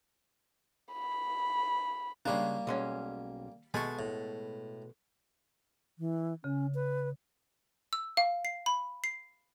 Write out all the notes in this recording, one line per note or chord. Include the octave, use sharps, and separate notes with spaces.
B5
C#3 G3 G#3 A#3 D4
B1 G#3 C#4
B2 G#3 A3 G#5 A5 C#6
A2
E3
C#3 C#4
B4
E6
F5
C7
B5
C7